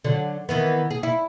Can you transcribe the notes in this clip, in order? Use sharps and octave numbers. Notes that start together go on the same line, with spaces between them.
D3 F#3
D#3 E3 B3
G#4
E4